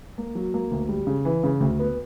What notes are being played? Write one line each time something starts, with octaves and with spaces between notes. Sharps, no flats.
A#3
F#3
A#3
D2
G3
C#3
E3
C#3
D2
B3